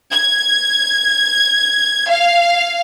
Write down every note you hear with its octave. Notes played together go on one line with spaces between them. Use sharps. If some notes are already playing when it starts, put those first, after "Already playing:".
G#6
F5